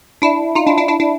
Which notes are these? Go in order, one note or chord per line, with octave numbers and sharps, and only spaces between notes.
D4 E4
D#4 F4
D4 E4
D4 E4
D4 E4
D4 E4